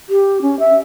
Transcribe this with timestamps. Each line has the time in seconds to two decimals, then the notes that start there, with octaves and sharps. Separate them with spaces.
0.09 G4
0.42 C#4
0.59 E5